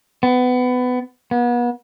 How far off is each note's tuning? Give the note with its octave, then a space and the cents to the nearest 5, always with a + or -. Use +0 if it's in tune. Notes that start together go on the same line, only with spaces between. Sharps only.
B3 +20
B3 -35